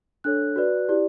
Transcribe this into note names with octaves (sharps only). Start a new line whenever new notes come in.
D4 A4 C#5 F#6
F#4 B4 D5
E4 G4 D5